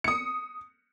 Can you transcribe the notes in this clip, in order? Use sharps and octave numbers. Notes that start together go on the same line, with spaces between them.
D#6 C#7